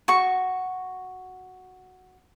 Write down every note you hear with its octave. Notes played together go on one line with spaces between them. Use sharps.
F#4 C#6